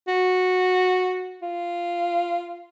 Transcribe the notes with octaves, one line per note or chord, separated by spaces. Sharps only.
F#4
F4